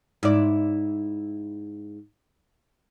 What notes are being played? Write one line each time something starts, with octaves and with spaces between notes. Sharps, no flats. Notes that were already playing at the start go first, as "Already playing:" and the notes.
G#2 E4 D5